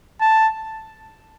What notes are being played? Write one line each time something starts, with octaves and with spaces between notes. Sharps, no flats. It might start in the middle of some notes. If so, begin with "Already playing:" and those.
A5